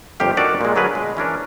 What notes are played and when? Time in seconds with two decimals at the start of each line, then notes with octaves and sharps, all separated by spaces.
0.20 G1 F2 A#3 G4 F5
0.37 D4 D#4 F#4 A4 A#4 D5
0.61 A#2 G#3
0.75 D3 F#3 G#4 A#4 B4
0.93 B2 G#3
1.17 E3 C#4 D4 A#4